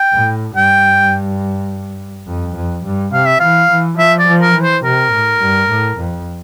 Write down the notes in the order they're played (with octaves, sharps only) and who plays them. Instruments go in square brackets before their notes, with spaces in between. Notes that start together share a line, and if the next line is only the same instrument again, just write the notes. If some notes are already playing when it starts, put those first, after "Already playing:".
Already playing: [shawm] G5
[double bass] A2
[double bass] G2 [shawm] G5
[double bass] F2
F2
G2
[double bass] C3 [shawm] F5
[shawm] E5
[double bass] E3 [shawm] F5
[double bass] E3
[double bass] F3 [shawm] E5
[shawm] D5
[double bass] F3
[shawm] A#4
[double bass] E3
[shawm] C5
[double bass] C3 [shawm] A#4
[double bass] A2
G2
A2
F2